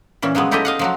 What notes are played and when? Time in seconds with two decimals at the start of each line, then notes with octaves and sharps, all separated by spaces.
0.22 A#2 E3 C#4
0.35 F3 F#3 G#3 B3
0.51 D#4 E4 G4 A4 C#5 D#5
0.65 D#5 F5 F#5
0.79 F3 F#3 F#4